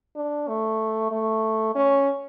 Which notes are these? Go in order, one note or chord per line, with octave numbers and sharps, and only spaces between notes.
D4
A3
A3
C#4